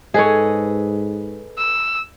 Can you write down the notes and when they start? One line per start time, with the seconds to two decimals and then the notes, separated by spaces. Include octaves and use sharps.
0.14 G#2 G#4 A4 B4 C#5 D#5
1.58 E6